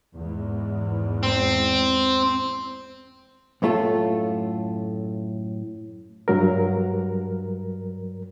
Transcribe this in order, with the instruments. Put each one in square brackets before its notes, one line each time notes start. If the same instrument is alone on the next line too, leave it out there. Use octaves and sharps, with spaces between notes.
[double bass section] E2 G#2
[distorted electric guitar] C4
[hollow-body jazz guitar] F#2 A2 A3 F4 A4
[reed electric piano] G2 F#3 A#4